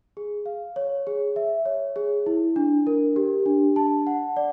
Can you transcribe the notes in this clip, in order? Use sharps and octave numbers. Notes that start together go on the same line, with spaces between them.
G#4
F5
C#5
G#4
E5
C#5
G#4
E4
D4
A#4
G4
D4
A5
F#5
D5